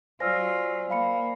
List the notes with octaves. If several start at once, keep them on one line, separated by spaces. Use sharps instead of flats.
F#3 F4 C5 D5 G#5 E6 F6 A#6
A#3 F5 B5 C#7